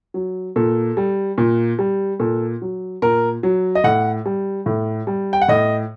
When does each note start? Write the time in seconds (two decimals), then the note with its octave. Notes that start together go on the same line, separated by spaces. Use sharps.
0.14 F#3
0.56 A#2 A4
0.97 G3
1.38 A#2
1.79 G3
2.20 A#2 A4
2.62 F#3
3.02 A#2 A#4
3.43 F#3
3.75 D#5
3.84 A2 F#5
4.25 G3
4.66 A2
5.07 G3
5.33 G5
5.41 F#5
5.48 A2 D#5